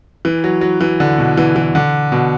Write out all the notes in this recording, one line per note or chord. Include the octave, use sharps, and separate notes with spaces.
E3
F#3
F#3
E3
D3
B2
E3
E3
D3
B2